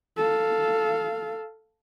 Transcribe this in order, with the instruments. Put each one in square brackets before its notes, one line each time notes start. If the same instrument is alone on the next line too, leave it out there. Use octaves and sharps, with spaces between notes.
[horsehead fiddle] A4 F5